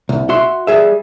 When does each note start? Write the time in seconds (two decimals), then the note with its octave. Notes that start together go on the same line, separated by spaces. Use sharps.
0.09 C2
0.29 F#4 E5 C6
0.67 G3 G#4 E5